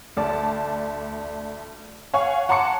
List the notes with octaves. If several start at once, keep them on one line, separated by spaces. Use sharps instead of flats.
D2 D5 A5
C#5 F5 F#5 G#5 C#6
F#5 A5 A#5 C6 D6 C#7